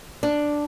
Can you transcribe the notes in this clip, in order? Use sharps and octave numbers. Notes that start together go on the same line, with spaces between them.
D4